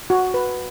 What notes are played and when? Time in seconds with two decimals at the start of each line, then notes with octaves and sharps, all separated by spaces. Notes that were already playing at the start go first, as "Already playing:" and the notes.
0.10 F#4
0.34 B4